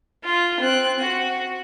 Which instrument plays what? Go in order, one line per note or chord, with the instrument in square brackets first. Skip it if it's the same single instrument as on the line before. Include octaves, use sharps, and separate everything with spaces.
[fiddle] F4
C4 F#6
F#4